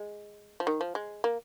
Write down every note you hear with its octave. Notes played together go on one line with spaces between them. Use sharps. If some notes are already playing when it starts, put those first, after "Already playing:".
Already playing: G#3
F3
D#3
F3
G#3
A#3